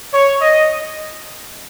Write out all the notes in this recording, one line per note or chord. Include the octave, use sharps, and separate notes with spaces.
C#5
D#5